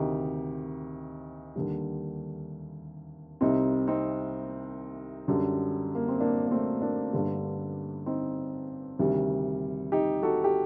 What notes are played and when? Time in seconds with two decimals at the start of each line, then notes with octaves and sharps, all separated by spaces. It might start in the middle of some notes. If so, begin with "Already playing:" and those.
Already playing: D2 C3 D#3 D#4 G4
1.56 D#2 D3 G3
3.41 C2 C3 G3 C4 D#4
3.87 C4 D#4
5.28 F#2 D3 G3
5.95 A#3
6.08 C4
6.20 A#3 D4
6.47 A#3
6.51 A3 C4
6.82 A#3 D4
7.13 G1 G2 D3 G3
8.06 C4 D#4
8.99 D2 C3 D#3 G3
9.92 D#4 G4
10.23 F#4 A4
10.44 G4